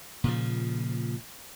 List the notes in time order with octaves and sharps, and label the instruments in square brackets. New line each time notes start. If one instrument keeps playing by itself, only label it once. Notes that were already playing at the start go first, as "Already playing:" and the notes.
[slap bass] A#2 C#3 F3